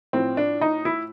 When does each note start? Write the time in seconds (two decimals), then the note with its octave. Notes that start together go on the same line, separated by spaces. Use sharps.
0.13 A2 F3 C4
0.37 D4
0.61 D#4
0.85 E4